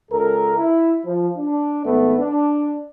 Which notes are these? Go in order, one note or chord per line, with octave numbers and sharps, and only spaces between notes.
C#2 A4 A#4
E4
F3
D4
G#1 A3 B3
D4